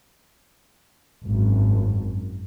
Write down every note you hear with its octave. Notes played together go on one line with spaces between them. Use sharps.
G#1 F#2